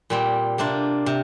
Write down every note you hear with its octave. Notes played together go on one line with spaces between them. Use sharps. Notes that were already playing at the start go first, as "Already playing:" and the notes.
A#2 G3 C4
C3 A#3 D4 F4
C3